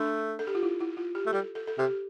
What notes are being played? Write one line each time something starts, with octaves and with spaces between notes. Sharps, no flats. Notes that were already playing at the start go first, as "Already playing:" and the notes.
Already playing: A3 D4
A4
G4
F4
E4
E4
F4
G4
A3
G3 A4
A4
A4
C3 G4